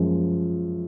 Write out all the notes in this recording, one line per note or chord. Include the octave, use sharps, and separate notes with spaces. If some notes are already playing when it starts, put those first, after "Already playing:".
Already playing: F#2 F3 G#3